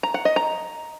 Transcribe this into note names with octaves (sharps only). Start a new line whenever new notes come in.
A#5
F#5
D#5
A#5